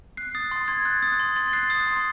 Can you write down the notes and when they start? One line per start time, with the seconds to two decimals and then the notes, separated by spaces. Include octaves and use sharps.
0.17 F#6 C7
0.35 D#6 A6
0.51 C6 A6
0.68 C6 G#6
0.85 F#6 A6
1.02 D#6 A6
1.20 C6
1.36 C6 A6
1.47 A6
1.53 F#6 C7
1.70 D#6
1.87 C6